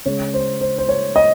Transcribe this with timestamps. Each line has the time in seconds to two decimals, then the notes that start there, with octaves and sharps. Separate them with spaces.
0.06 C#3 G#3 C#5
0.34 C5
0.61 C5
0.78 C5
0.89 C#5
1.16 D#5